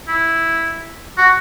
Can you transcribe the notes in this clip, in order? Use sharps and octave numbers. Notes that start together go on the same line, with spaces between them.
E4
F#4